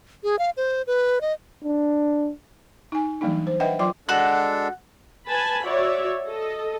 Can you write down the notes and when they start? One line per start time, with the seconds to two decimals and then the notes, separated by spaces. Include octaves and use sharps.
0.23 G#4
0.39 F5
0.57 C5
0.87 B4
1.21 D#5
1.64 D4
2.92 D#4 G#5
3.21 E3 F#3 G3 A#3 D4 D#4
3.47 C5
3.60 D4 B4 D#5 E5 F#5 G5
3.79 F#3 F4 D5 G5 C6 D6
4.09 G#3 D4 F#4 A4 F#6
5.27 B4 G#5 A5 B5
5.64 F#4 C#5 D5 E5
6.27 A4 D#5